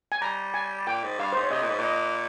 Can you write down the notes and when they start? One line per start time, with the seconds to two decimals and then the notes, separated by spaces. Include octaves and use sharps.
0.12 G#5
0.21 G3 A#5
0.54 G#5
0.87 A#2 G5
1.03 G#2
1.19 G2 F5
1.33 G#2 C5
1.43 C#5
1.51 C3 D#5
1.61 A#2
1.70 G#2
1.79 A#2
1.84 D#5